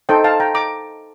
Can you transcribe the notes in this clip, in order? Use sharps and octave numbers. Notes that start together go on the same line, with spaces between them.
D#4 A4 C5 D#5 G5
F5 A5
G5 A#5
A#5 D6